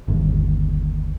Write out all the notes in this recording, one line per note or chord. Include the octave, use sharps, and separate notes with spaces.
G1 D#2